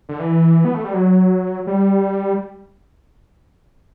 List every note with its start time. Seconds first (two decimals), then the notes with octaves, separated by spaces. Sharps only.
0.09 D3
0.20 E3
0.65 B3
0.74 A3
0.84 G3
0.94 F#3
1.67 G3